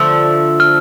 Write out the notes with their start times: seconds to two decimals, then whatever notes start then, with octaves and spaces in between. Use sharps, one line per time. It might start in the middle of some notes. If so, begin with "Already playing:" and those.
Already playing: D3 F3 A3 E6
0.60 F6